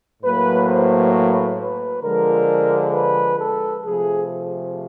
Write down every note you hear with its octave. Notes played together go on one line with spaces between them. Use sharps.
A2 F#3 A#3 B4
C5
B4
B4
D3 F3 G#3 A#4
B4
A4
C3 F3 A3 G#4